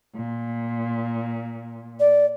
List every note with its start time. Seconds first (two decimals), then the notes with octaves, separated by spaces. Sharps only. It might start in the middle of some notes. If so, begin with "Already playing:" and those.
0.16 A#2
2.00 D5